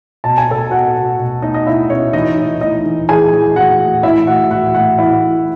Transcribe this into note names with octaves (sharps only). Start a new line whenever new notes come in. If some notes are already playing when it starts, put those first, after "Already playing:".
B2 A5
G#5
B2 A4 A5
B2 F#4 F#5
B2
B2
B2 D#4 D#5
D#5
B2 E4 E5
B2 C#4 C#5
E3 D#4 D#5
E3
E3 D#4 D#5
E3
E3 G#4 G#5
E3
E3 F#4 F#5
A2
E3 E4 E5
A2 F#4 F#5
E3 F#4 F#5
A2 F#4 F#5
E3 E4 E5
A2